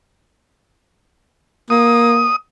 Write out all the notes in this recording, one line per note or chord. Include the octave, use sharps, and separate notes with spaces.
A#3 D#6